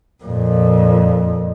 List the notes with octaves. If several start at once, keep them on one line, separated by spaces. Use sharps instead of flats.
F2 A#2